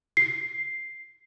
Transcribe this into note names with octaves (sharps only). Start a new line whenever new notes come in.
C7